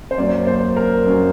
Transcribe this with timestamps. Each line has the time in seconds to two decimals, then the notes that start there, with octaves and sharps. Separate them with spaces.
0.11 C5
0.18 F#2 F#3 A#3 D5
0.47 C5
0.76 A#4
1.06 F#2 F#3 A#3